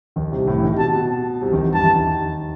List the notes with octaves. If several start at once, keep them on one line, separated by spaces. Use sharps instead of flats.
D#2 D#3
C2 C3
A2
E3
D#3
C3
B2 A5
B2
C2 C3
D#2 D#3
E2 E3
G2 G3 A5
E2 E3
D#2 D#3